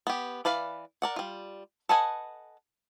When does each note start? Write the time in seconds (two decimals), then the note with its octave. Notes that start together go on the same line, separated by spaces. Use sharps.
0.07 B3 G4
0.45 E3 B4 D5 F5
1.02 A#4 D5 F#5
1.16 G3 F4
1.89 A4 B4 D#5 F#5 G#5